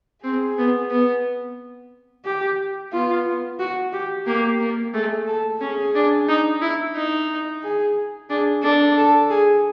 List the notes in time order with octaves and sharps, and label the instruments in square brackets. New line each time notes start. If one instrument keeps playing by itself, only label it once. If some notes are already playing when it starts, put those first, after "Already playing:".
[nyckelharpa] C4 [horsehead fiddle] G#4
[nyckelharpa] B3
B3
[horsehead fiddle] G4
[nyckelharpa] B3 [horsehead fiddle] F4
[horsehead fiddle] F#4
G4
[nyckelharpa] A#3 [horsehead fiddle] G4
[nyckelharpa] A#3
[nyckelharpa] A3 [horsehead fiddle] G#4
[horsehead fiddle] A4
[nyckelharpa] C#4 [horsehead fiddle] G#4
[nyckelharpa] D4
D#4
E4
D#4
[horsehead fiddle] G#4
[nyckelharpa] D4 [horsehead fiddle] G#4
[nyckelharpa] D4 [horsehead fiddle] A4
[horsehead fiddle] A4
G#4